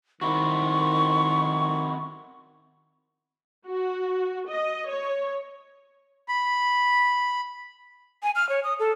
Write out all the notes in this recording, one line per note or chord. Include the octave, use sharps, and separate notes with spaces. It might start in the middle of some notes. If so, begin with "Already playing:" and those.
D#3 C4 E4 F#4 C#6
F#4
D#5
C#5
B5
G#5
F6
C#5
D#6
A4